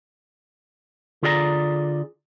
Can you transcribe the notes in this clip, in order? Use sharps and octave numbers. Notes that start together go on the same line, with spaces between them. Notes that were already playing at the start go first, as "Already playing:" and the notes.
D3 F4 G#4 D5 E5 A#5